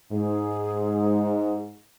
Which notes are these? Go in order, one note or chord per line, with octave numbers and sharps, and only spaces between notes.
G#2 G#4